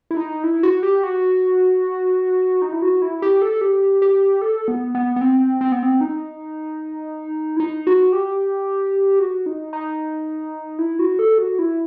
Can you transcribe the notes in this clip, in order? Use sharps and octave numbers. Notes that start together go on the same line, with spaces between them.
E4
D#4
E4
F#4
G4
F#4
D#4
E4
F#4
E4
G4
A4
G4
G4
A4
B3
B3
B3
C4
C4
B3
C4
D#4
E4
D#4
F#4
G4
F#4
D#4
D#4
E4
F#4
A4
F#4
E4